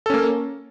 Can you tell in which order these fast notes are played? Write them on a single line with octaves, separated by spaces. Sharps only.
A4 C#4 A#3